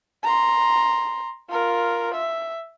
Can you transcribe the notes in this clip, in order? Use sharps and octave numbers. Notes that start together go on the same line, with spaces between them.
A#5 C6
F4 A#4
E5